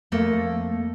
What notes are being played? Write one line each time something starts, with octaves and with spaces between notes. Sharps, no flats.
F2 A3 A#3 A4 A#4